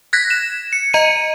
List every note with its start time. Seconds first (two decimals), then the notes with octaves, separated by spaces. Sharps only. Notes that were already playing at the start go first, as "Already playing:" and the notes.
0.13 F#6 G#6 A#6 B6
0.30 E7
0.73 C#7
0.94 D#5 A#5 C#7 D#7